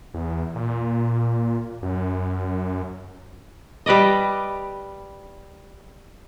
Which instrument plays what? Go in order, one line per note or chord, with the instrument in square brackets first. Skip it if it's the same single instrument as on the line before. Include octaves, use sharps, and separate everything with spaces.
[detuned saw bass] E2
A#2
F#2
[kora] G3 B4 D5 D#5